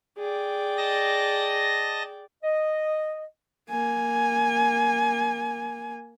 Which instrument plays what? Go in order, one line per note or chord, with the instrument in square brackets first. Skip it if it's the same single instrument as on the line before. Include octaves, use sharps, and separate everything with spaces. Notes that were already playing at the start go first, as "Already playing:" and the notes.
[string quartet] G#4 D5 G5
[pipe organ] D#5 A5 A#6
[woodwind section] D#5
[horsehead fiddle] A#3 G#5